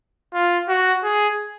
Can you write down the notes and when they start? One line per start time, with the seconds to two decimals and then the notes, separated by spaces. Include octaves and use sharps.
0.34 F4
0.69 F#4
1.04 G#4